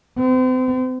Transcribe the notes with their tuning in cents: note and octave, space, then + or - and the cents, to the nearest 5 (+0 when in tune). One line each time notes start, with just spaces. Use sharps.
C4 -35